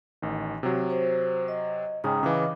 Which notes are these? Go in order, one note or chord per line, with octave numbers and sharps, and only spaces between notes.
A1 D#3
C3 F#3
C5
D#5
G#2 C#3 C#4 G5 A#5 D#6
C#3 E3 D#5 F5 D6